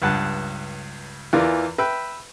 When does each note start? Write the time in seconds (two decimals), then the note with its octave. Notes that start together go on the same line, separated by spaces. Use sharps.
0.02 C#2 G2 F#5 A5
1.33 E2 E3 F4 A#4 D5
1.78 B4 E5 G5